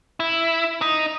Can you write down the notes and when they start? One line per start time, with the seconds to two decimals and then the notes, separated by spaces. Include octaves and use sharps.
0.20 E4
0.82 D#4